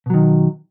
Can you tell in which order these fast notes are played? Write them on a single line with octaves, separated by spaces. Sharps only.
B2 F#3 D#3